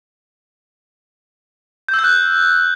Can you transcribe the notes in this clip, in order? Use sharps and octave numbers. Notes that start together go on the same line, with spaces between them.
G6
E6
G6
F#6